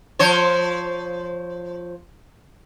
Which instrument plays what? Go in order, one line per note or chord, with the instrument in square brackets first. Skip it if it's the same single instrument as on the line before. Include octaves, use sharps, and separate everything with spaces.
[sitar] F3 C5 C#5